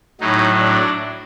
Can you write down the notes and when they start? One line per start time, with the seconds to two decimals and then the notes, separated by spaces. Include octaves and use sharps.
0.21 A2 F#3 D#4
0.62 D4